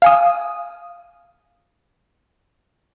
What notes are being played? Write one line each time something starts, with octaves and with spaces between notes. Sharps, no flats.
F5 G#5 D#6